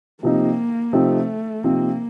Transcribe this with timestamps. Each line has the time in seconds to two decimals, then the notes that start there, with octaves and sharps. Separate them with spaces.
0.23 C3 F3 A#3 C4 D#4
0.93 C3 F3 A3 C4 D#4
1.63 C3 F3 A#3 C4 D#4